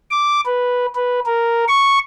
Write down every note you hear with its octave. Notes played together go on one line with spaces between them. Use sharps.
D6
B4
B4
A#4
C#6